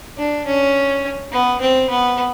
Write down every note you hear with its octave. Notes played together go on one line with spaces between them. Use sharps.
D4
C#4
B3
C4
B3